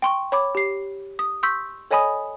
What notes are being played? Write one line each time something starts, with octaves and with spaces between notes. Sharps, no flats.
G5 C6 C#6
C#5 B5 D6
G4 C7
D#6
C6 C#6 E6 G6 B6
A4 C#5 D#5 G#5 B5 D#6